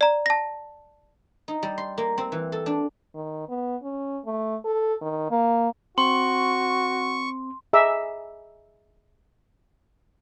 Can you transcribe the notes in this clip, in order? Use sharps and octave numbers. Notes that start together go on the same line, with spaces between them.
D5 A#5
A5 A#6
D#4
G3
C6
A#3
C4
E3
A4
D4
D#3
B3
C#4
A3
A4
D#3
A#3
C4 F#4 C6 C#6
G#4 D#5 E5 A#5 D6 E6